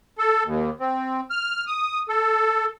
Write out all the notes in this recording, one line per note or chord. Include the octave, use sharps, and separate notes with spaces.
A4
D#2
C4
F6
D#6
A4